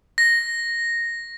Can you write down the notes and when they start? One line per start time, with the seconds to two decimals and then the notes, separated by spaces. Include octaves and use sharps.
0.18 A#6